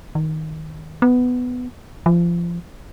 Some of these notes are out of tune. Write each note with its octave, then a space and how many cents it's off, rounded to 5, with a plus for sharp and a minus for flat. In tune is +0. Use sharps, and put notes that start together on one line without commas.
D#3 +10
B3 +10
F3 -25